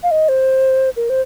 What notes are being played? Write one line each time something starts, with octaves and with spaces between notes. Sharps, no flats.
F5
D#5
C5
A#4
C5